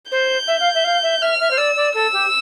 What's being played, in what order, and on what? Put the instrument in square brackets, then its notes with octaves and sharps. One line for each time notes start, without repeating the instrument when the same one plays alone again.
[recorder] C5 [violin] G6
[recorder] E5
F5
E5
F5
E5
[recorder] E5 [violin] F6
[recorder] E5
C5
[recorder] D5 [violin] E6
[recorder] D5
[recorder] A4 [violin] E6
[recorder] G4